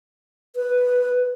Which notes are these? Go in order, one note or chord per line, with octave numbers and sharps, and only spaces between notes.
B4